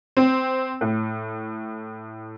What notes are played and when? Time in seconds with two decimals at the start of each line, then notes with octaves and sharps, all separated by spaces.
0.17 C4
0.81 A2